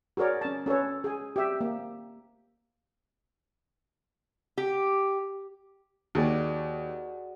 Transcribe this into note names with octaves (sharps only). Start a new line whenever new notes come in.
F#4 G#4 A#4 C#5 D5
C#4 A5
C#4 A4 B4 C#5
G#4 G#5
G4 E5
A#3
G4
D#2 F#4 G#4 D5